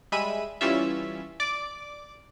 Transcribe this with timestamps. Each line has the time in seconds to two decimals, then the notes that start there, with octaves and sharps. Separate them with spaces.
0.12 G3 G#3 E5 B5 D#7
0.61 E3 G3 C#4 F4 E5
1.40 D5 D6